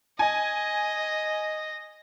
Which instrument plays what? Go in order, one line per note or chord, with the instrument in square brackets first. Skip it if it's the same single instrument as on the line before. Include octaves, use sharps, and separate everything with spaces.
[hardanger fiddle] D#5 [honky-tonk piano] G#5